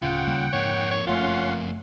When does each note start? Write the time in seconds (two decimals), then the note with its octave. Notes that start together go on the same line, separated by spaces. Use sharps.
0.02 D1 C#3 F4 F#5 G5
0.27 D#2 G3 A#3
0.53 F2 G#2 A#3 C#5
0.91 C#5
1.07 F#1 A3 C#4 F4 F#5 C6